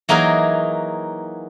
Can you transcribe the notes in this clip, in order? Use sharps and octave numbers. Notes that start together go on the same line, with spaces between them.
E3 F#3 A#3 D#4 G#4 A#4